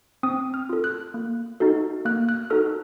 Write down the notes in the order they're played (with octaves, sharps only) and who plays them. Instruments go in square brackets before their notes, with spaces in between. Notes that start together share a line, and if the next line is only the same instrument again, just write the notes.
[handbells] C4 D#6
F6
F4 A4
F#6
A#3
D#4 F#4 A4
A#3 F#6
F#6
D#4 F#4 A4 F6